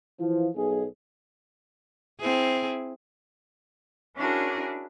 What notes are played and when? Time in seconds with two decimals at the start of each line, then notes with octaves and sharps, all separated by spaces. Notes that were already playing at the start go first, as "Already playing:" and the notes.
0.19 E3 F3
0.56 B1 G#4
2.21 C4 E4 G#4
4.15 C#4 D4 E4 F#4 G#4 A#4